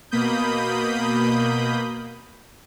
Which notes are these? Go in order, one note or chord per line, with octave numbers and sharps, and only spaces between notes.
B2 A#3 B5 D#6 G6